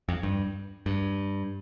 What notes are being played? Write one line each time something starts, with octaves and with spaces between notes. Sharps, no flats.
F2
G2
G2